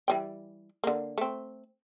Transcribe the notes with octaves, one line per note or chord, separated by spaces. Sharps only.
E3 G3 G5
D3 A#3
A3 C4